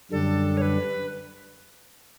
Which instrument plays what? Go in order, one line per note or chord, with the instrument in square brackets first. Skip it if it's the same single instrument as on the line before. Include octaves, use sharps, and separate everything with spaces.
[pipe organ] F#2 D3 G3 D4 [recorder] A4
[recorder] C#5
B4